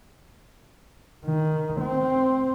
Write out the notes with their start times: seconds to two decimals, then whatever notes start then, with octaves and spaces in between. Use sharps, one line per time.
1.25 D#3
1.81 C4